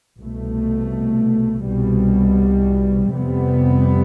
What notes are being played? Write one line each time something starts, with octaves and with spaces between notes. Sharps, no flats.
C2 B2 A3
C2 B2 G3
F2 C3 G3 B3